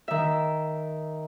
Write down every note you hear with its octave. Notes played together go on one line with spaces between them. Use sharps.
D#3 E5